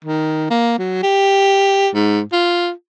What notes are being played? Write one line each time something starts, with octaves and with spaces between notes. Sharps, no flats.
D#3
A#3
F#3
G4
G#2
F4